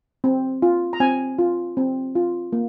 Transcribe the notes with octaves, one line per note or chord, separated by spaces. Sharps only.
C4
F4
A#5
C4 G#5
F4
C4
F4
A#3